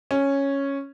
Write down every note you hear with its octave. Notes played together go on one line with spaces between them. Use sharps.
C#4